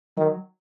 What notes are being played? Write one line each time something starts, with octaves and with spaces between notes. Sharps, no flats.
D#3 F#3